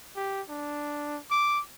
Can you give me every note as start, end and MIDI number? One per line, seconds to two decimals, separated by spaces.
0.16 0.41 67
0.49 1.18 62
1.31 1.60 86